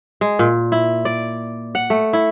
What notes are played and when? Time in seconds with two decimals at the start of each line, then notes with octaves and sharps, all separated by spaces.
0.21 G#3
0.39 A#2
0.72 E4
1.05 D5
1.75 F#5
1.90 A3
2.13 E4